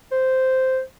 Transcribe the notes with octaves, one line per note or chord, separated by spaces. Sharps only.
C5